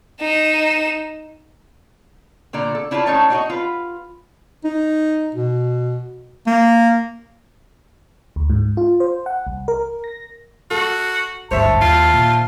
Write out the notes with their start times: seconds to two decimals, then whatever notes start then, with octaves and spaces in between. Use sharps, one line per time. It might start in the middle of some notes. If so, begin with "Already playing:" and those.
0.21 D#4 E7
2.53 A#2 D3 A#3 D5 A#5
2.75 A4
2.91 D4 E4 F4 C#5 D5 F5
3.06 A2 C#4 D#4 C#5 A5 A#5
3.30 D4 D#4 F#4 C5 C#5 D#5
3.50 F4 B4
4.64 D#4
5.35 B2
6.47 A#3
8.36 D2
8.50 G#2
8.77 F4
9.00 C5
9.26 F#5
9.47 C2
9.68 A#4
10.04 A#6
10.71 F#4 A4
11.51 G#1 D2 G2 C5 C#5 E5 A5
11.82 D#2 F4
12.14 A#2 D#3